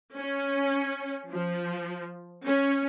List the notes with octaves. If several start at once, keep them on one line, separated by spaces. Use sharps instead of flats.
C#4
F3
C#4